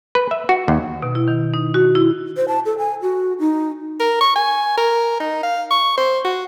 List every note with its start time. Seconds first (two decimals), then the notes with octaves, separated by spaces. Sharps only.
0.15 B4
0.31 E5
0.49 F#4
0.68 D#2
1.02 B2
1.15 E4
1.28 D#3
1.54 D#4
1.74 F#4
1.95 E4
2.37 C5
2.48 A5
2.66 A4
2.78 G#5
3.02 F#4
3.39 D#4
4.00 A#4
4.21 C#6
4.36 G#5
4.77 A#4
5.20 D#4
5.43 F5
5.71 C#6
5.97 C5
6.25 F#4